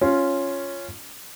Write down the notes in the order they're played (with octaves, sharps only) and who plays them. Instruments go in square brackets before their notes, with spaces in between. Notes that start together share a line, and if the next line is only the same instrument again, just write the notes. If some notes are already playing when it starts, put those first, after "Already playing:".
[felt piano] C#4 F4